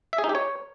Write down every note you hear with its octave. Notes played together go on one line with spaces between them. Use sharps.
E5
G#4
D#4
G4
C#5